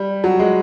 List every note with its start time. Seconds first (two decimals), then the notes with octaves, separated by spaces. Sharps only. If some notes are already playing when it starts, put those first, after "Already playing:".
Already playing: G3
0.24 F#3
0.39 G#3